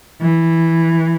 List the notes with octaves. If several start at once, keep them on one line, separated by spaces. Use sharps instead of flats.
E3